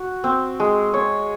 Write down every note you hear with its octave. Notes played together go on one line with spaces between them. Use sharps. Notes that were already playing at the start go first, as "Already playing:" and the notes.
Already playing: F#4
C4
G#3
C#5